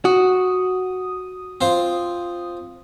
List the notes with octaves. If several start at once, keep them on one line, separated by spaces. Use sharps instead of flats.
F#4 D#6
C4 F4 C5